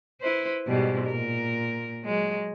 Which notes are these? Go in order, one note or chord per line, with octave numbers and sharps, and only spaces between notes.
E4 B4 C5
G#2 B2 G3
A#2 A#4
F#3 G#3